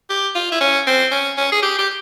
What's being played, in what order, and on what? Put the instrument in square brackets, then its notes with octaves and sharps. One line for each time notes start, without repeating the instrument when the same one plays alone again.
[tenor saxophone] G4
F4
E4
C#4
C4
C#4
C#4
G#4
G4
G4